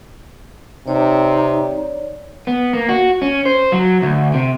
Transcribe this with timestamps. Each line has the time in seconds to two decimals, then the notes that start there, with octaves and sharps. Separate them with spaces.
0.87 C3 D#4 C#5 D5
2.47 B3
2.73 A#3
2.89 F#4
3.22 C#4
3.45 C5
3.72 F#3
4.02 D2
4.34 C3